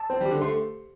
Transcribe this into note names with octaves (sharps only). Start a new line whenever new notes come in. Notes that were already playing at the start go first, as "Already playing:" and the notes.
Already playing: A5
C4 C5
G3
G4
D3
A3 C6